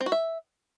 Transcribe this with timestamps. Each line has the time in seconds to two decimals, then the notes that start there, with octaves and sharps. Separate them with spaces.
0.01 C4
0.06 F#4
0.12 E5